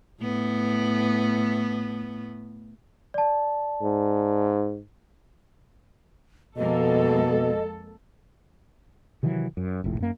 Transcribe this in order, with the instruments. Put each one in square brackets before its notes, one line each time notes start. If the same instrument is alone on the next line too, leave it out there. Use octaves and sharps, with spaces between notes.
[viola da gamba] A2 B3
[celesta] D5 A5
[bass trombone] G#2
[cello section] F2 G#3 A#3 [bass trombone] B2 [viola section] A4 [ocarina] D#5
[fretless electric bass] C3 D#3 E3 F#3
F#2
F1 A#1 A2
F#2 A#3